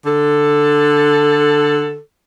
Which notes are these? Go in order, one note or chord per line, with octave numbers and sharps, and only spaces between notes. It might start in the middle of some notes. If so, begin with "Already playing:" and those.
D3 A4